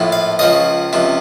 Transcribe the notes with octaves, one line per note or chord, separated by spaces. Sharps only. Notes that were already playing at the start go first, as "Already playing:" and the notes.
Already playing: A#1 A2 F3
F5
C#2 C#3 F3 D#5
C#2 C3 F3